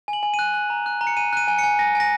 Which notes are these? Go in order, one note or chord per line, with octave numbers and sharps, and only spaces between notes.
G#5
F#7
G#5
D#7
F#6
F#6
A#5
F#6
A#5
C#7
G#5 D#7
F#6 D#7
G#5
C#7
G#5
G#5 A#6
G#5 A#6